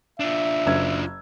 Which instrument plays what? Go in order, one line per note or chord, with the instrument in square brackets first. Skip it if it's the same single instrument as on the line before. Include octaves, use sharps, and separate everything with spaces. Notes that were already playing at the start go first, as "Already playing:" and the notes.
[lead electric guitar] D4 F4 [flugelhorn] E5
[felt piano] F#1 E6 G#6